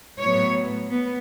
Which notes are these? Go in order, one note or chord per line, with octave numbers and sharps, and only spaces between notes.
A2 F#3 B3 C#5
B3